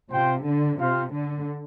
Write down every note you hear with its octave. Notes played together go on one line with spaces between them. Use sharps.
C3 F4 C5 G5
D3
C3 F4 C5 F5
D3